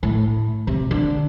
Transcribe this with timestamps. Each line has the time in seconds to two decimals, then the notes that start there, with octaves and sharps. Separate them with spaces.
0.03 A2
0.67 C3
0.91 D3